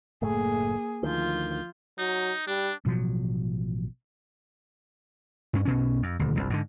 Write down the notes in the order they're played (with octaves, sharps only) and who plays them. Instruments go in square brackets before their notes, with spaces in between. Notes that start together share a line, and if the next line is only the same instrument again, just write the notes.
[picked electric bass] F#1 A2 A3 [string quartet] A#3 G#4
[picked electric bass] D2 D#3 [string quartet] F3 F4 G6
[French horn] F#3 [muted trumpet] D#4
[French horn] G3 [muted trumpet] D4
[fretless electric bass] A1 B2 F3 F#3
[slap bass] G2 C#4
B1 B2 C#4
F2
D#1 D2
G1 C2
G#2 B2 D3